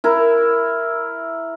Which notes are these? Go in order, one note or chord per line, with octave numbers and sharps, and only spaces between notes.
E4 A#4